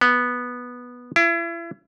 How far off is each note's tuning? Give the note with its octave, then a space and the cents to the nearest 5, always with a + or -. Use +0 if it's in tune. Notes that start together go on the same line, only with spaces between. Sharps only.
B3 -10
E4 +35